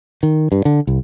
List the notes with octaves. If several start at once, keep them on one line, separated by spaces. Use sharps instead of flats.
D#3
G2
D3
C2